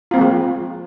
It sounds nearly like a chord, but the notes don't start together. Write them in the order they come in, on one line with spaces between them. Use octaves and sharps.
F4 C4 A#3 G#3 F3